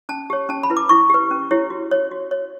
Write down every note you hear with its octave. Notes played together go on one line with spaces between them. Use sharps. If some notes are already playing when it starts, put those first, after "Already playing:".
C#4 A5
G4 C#5
C#4 A5
B5
E4 B4
D6
E4 C#6
G4 B4
C#4
E4 G4 C#5
F#4
C#5
F#4
C#5